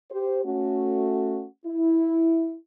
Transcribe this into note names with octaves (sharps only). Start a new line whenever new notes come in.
G4 C5
A3 C#4 F#4
E4